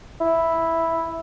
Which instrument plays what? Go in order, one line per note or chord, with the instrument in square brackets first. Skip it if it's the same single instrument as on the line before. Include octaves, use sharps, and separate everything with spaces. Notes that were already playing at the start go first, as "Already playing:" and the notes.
[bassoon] E4